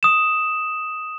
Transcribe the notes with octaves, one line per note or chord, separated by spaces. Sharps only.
D#6 E7